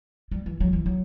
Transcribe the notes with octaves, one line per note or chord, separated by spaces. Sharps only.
G3
E3
F#3
E3
F#3